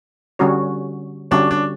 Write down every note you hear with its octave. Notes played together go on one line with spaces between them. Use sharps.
D3 G3 C#4 F#4 C#5
D3 G3 C#4 D4 F#4 C#5
D4